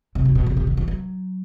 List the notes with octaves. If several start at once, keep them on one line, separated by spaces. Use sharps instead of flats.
C3
F#2
B2
C3
C3
D3
E3
F#3